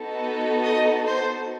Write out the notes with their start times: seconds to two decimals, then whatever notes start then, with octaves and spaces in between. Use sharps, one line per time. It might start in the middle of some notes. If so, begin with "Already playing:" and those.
Already playing: B3 D#4 F#4 A4
0.62 D#5
1.07 C5